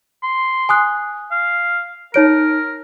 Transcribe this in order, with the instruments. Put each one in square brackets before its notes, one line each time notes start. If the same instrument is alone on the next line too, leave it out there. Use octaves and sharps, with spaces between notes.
[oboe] C6
[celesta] G#5 D#6 F#6
[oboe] F5
[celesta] D#4 C#5 D7 [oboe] A#4